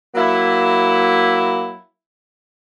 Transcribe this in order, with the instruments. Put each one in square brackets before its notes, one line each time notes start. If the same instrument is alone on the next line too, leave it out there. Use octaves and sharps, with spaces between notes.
[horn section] F#3 A#3 E4